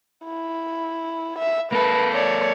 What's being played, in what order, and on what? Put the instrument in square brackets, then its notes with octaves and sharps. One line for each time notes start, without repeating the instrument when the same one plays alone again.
[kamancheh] E4
E5
[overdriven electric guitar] A#3 A4 [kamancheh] B4
[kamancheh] C#5 D5